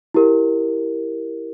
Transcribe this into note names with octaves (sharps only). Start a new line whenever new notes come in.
E4 G4 A#4